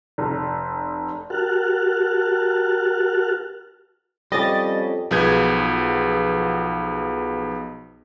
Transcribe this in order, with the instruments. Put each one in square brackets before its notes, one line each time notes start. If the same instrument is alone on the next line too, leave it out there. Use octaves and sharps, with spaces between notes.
[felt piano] F1
[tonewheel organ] F#4 G4 A#4 A5 F6 F#6
[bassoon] F2 [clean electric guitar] G3 C#4 G4 [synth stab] D#5 A6
[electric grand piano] B1 F3 B3 G#4 G6 G#6